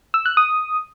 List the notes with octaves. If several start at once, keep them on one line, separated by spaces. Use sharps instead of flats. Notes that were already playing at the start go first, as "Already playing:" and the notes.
E6
F#6
D#6